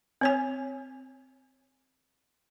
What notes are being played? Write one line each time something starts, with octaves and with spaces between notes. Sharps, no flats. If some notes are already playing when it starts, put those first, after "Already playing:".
C4 C#5 G#5